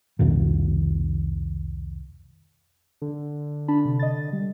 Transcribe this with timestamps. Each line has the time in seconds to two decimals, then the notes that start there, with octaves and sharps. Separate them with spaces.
0.19 C2 F2 B2 D#3
3.02 D3
3.68 D4 A5 B5
3.85 C3
3.99 D#5 A6
4.33 G3